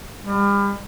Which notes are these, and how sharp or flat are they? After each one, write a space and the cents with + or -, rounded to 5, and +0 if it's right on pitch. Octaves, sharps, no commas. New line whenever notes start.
G3 +40